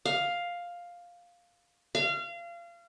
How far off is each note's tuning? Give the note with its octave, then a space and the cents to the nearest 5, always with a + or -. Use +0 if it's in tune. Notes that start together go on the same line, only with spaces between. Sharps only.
F5 +5
F5 -30